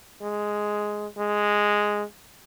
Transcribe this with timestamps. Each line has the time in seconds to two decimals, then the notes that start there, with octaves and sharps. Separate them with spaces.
0.21 G#3
1.17 G#3